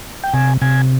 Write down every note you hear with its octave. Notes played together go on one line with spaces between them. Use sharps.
G5
C3 G#5
C3 G#5